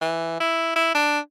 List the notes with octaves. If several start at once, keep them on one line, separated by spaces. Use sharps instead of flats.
E3
E4
E4
D4